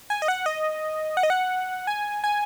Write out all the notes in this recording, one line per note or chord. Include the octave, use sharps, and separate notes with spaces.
G#5
D#5
F#5
D#5
F#5
D#5
F#5
G#5
G#5